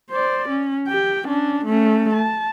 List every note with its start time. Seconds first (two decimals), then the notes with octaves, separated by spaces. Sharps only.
0.11 C5 D5
0.49 C#4
0.88 G4 G5
1.27 C#4 D4
1.65 A3 C#4
2.13 A5